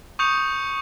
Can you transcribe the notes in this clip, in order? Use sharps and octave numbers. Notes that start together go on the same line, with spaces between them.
C#6 D#6 G6 C#7 F7